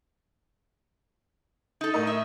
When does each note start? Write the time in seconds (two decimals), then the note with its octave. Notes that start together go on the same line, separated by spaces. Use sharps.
1.81 D#4 A4
1.94 A2 A#4 D#5
2.07 E5